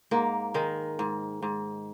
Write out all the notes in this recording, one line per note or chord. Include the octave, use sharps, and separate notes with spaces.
G#2 A#3
D#3 G#3
G#2
G#2